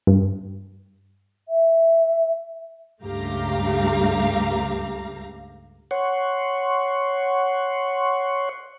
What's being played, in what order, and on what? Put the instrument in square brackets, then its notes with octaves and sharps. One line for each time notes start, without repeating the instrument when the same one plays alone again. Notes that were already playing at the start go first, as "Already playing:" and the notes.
[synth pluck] G2
[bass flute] E5
[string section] C#2 G2 A3 G4 F5 A#5
[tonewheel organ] C#5 F#5 C6 C#6